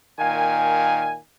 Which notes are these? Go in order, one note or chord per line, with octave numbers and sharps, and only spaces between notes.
A#2 D#3 F5 G#5